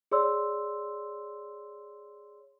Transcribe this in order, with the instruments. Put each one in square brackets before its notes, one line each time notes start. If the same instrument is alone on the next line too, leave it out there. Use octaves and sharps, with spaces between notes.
[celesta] G#4 C#5 D5 C6 E6